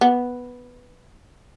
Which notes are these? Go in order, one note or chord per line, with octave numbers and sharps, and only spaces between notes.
B3